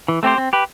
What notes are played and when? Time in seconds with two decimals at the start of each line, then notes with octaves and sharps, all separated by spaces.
0.08 E3
0.23 A3 C4 G4 C5
0.38 C4
0.53 G4 B4